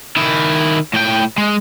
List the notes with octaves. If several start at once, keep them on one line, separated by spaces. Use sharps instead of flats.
D#3 E4
A2 G5
G#3